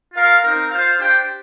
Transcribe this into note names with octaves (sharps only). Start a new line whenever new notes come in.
F4 A#4 F5
C4 D#4 A#4
F4 C5 F5
D4 G4 C5 G5